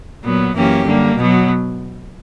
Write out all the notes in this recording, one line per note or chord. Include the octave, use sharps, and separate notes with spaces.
A#2 F#3 B3
F#2 E3 A#3 C#4 G4
D3 G3 A#3
B2 F#3 B3